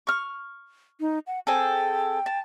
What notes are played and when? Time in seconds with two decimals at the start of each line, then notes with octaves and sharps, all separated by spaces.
0.07 C#6 F6
1.00 D#4
1.27 F#5
1.47 C4 G#4 A4 G5
2.26 A5